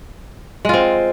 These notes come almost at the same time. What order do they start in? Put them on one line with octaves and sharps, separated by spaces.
G#3 F4 C4